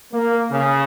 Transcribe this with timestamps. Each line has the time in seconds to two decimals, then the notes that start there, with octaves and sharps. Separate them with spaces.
0.12 A#3
0.50 C#3